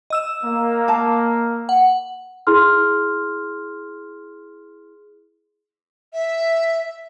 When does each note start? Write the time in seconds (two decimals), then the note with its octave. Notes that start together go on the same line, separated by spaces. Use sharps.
0.10 D#5 E6 E7
0.43 A#3
0.88 F5 A5
1.69 F#5
2.47 E4 G#4 C6 F6
6.13 E5